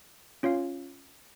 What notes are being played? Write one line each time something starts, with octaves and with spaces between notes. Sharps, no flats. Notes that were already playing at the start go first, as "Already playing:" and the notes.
C#4 F4 C#5 F5